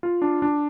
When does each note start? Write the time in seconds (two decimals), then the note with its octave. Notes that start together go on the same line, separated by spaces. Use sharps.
0.03 F4
0.22 D4
0.42 D4